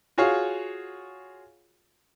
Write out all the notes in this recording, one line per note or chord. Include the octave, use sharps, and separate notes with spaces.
F4 F#4 G#4 C#5 F5